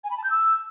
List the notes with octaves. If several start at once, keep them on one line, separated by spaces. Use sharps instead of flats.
G#5
B5
A5
G6
E6